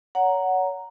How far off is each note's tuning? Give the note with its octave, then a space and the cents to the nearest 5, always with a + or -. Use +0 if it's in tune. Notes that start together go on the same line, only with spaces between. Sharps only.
C#5 +30 F#5 +0 A#5 +0